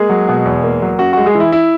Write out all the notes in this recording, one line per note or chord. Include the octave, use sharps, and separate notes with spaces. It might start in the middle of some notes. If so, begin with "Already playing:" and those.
Already playing: G#3 A#3 G#4
F#3
B2
E2
A#3
F#3
F#2 F#4
G#3 F#4
G#3 G#4
E3
E4
E4